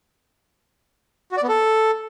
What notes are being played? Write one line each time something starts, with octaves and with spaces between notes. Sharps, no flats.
F#4
D5
B3
A4